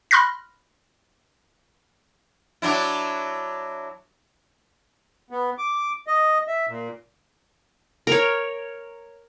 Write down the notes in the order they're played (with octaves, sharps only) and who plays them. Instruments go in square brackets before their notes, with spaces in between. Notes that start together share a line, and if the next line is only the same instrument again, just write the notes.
[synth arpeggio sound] B5 C6 F6 F#6 A#6
[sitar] F#3 D4 E4
[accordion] B3
D6
D#5
E5
A#2
[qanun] A#4 C#5